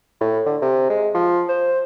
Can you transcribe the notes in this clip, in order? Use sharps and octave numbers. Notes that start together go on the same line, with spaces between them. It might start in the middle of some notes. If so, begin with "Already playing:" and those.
A2
D3
C3
G#3
F3
C5